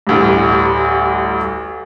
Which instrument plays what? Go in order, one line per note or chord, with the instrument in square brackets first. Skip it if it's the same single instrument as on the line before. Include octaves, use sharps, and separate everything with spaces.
[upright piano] A1 D2 G2